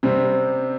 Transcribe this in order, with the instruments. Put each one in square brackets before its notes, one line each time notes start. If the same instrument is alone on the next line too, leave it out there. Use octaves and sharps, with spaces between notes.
[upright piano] C3 G3 C4